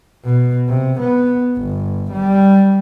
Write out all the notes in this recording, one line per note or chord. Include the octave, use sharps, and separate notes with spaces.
B2
C3
B3
G1
G3